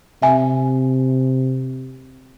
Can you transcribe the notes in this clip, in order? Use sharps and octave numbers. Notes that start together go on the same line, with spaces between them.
C3 E5 G#5